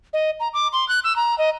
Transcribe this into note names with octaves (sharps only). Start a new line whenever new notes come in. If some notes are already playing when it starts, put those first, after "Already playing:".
D#5
A#5
D6
C6
F#6
E6
A#5
D#5